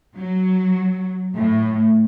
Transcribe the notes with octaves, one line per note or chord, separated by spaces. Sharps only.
F#3
A2